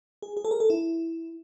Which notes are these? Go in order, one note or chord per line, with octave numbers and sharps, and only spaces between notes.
G#4
G#4
A4
A#4
A4
E4